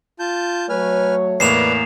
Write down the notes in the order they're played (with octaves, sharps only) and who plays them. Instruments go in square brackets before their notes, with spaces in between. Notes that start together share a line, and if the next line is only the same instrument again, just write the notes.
[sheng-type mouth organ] F4 A5 G6
[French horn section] F#3 A3 C#5 [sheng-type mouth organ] B4 G#5 F6
[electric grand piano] E2 A2 A#3 [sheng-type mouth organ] B4 D5 [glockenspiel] C7 E7 F7